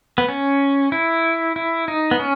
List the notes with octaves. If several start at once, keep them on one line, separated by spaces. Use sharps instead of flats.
B3
C#4
E4
E4
D#4
B3
C#4